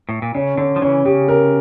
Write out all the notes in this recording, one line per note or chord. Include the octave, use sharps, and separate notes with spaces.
A2
A#2
C#3 C#4
D3 C#4
F3
C#3 E3 C#4
C#3 G4
A#4